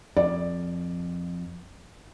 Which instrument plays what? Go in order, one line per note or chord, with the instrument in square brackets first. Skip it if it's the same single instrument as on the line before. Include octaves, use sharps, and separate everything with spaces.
[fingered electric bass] F2 [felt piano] D5